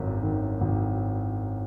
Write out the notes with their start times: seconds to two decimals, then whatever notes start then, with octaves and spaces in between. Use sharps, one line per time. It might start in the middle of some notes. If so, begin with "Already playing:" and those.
Already playing: G#1 F#2
0.23 D#3
0.61 G#1